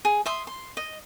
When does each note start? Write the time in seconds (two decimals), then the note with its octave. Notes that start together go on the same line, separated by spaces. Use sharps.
0.05 G#4
0.26 E5 C6 D#6
0.47 C6
0.77 D#5